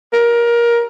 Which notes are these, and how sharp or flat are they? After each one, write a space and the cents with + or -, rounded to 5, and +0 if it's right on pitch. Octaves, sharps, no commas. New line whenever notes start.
A#4 +20